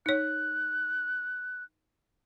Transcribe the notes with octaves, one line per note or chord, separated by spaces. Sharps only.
D#4 C#5 F#6